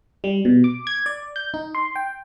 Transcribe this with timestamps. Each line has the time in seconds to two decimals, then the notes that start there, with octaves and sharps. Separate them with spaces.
0.24 G3
0.45 B2
0.64 D6
0.87 G#6
1.06 D5
1.36 G6
1.54 D#4
1.75 C6
1.96 G5